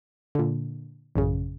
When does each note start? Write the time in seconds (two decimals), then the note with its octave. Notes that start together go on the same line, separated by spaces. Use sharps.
0.35 A#2 D3
1.16 A1 F#2 C#3